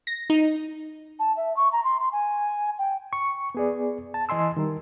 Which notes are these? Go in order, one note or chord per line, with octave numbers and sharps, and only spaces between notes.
A#6
D#4
A5
E5
C#6
A#5
C6
C6
G#5
G5
C#6
B3 G#4 D5
A5
E3 D#5 G#5 C6 E6
D#3 G3 A#4